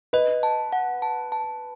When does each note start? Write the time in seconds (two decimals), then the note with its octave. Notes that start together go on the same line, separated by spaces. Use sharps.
0.13 B4 D#5
0.43 A5
0.73 F#5
1.02 A5
1.32 A5